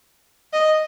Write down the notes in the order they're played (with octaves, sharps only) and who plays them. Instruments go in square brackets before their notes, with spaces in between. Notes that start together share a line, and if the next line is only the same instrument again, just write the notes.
[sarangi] D#5